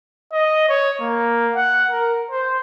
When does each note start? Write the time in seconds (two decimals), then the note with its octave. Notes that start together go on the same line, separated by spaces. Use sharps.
0.32 D#5
0.69 C#5
1.00 A#3
1.55 F#5
1.91 A#4
2.31 C5